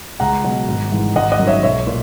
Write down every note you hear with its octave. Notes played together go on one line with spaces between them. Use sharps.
C#2 F#5 A#5
B2 F#3
G#1
G#2 E3
G#1 D#5 F#5
D#5 F#5
F#2
D#3 C#5 E5
B1 C#5 E5
A#2